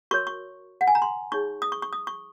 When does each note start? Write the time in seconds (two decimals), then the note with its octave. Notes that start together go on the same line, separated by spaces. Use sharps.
0.11 F#4 A#4 C#5 C#6
0.27 C#6
0.81 F#5
0.87 G#5
0.95 A#5
1.02 C6
1.32 D#4 G#4 C#5 C#6
1.62 D#6
1.72 C#6
1.82 C#6
1.93 D#6
2.07 C#6